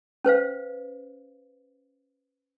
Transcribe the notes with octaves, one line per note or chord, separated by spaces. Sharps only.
C#4 B4 C5 F5